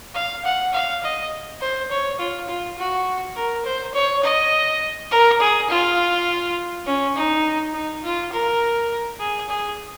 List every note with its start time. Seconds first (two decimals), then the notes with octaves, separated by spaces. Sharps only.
0.14 F5
0.45 F#5
0.73 F5
1.03 D#5
1.61 C5
1.91 C#5
2.19 F4
2.48 F4
2.78 F#4
3.35 A#4
3.65 C5
3.94 C#5
4.23 D#5
5.11 A#4
5.40 G#4
5.70 F4
6.86 C#4
7.16 D#4
7.73 D#4
8.03 F4
8.32 A#4
9.19 G#4
9.49 G#4